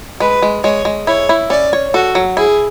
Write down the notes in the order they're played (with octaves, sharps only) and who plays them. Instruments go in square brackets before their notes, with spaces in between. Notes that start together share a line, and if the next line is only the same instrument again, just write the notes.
[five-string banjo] G#3 [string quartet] B4
[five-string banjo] G#3
[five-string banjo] G#3 [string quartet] C#5
[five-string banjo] G#3
[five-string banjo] E4 [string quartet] C#5
[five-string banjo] E4
[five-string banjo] C#4 [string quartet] D5
[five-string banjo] C#5
[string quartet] F#4 [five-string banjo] A4
[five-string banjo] F#3
[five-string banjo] E4 [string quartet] G#4